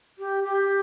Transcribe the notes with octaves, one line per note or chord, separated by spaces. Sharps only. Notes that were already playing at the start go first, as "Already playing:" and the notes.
G4
G4